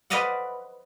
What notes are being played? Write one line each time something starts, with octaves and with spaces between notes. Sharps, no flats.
B4 C5 D5 D#5 F5 F#5